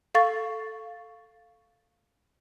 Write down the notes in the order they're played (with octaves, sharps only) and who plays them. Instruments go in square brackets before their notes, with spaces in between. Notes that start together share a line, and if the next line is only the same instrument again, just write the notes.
[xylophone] A4 F5 C#6 A6